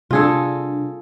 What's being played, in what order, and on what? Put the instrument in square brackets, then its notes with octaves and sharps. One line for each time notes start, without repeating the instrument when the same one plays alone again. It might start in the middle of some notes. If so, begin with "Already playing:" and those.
[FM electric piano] C3 G3 D4 [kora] F4 G#4 A4